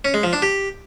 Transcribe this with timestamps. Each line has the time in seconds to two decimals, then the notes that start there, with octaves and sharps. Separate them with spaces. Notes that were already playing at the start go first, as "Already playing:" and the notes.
0.05 C#4
0.14 G#3
0.23 F3
0.33 D4
0.42 G4